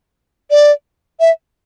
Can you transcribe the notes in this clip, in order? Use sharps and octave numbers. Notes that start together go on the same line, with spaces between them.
D5
E5